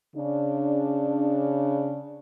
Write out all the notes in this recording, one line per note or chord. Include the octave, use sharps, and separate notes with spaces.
C#3 D4